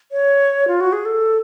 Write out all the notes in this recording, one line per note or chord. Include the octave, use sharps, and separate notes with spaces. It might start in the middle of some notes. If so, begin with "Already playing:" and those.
C#5
F4
F#4
G#4
A4